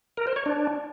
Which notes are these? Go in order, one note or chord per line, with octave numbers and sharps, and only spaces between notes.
A#4
C5
C#5
D4